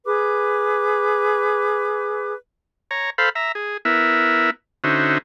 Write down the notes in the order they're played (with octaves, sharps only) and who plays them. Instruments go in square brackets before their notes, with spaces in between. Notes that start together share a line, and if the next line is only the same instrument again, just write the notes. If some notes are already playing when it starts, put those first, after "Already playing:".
[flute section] G#4 B4 D6
[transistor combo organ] C#5 A#5
A4 C5 F5 B5
E5 A#5
G#4
B3 E4 A#4 E5
D3 C#4 D#4 F#4 C5 E5